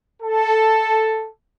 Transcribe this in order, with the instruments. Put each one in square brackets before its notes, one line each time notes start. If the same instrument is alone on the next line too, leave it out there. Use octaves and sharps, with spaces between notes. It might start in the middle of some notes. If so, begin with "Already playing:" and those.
[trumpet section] A4